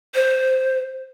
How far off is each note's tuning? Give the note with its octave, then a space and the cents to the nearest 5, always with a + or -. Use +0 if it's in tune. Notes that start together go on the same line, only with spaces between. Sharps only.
C5 -5